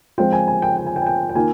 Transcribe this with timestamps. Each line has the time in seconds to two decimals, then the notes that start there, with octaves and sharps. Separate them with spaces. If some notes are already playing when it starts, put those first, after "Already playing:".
0.18 F3 G#3 C4 F4 G5
0.33 G#5
0.48 G#5
0.62 G5
0.77 G5
0.86 G#5
0.96 G5
1.02 G#5
1.06 G5
1.29 G5
1.35 D#3 A#3 F4 G#5